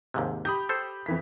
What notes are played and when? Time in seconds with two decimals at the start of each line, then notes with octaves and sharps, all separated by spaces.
0.14 D#2 G#2 C3
0.45 G4 B5 D#6 G6
0.69 A4 C5
1.06 F2 E3 B6